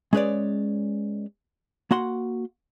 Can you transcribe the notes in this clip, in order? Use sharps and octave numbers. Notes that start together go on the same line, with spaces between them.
G#3 C#4 G#4 B4 C#5 D5
A#3 F#4 F#5 C6